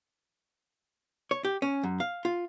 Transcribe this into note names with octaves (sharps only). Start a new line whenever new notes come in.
C#5
G4
C#4
F#2
F5
F4